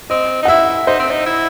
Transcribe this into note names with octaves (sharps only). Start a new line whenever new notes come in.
C4 D#5
D#4
F#5
E4 E5
D#4 C5
C4
D#4
E4